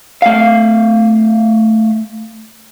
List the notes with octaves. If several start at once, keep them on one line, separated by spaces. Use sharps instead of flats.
A3 F5